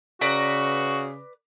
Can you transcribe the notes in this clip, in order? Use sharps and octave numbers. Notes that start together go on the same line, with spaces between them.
C#3 F#4 B4 D5 A#5